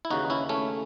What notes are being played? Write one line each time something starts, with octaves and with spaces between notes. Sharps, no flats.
E4
D#2 C#3 E3 D#4 F#4
C#4 E4
A3 C#4